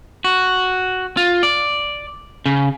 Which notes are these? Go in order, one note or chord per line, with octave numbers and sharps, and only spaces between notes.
F#4
F4
D5
C#3